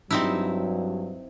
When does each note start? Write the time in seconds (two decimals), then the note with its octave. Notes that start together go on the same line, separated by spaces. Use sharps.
0.11 G2 F#3 C4 D#4 E4